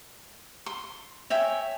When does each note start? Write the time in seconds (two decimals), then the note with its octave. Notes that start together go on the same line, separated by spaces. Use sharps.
0.66 C6
1.30 C#5 E5 G5 G#5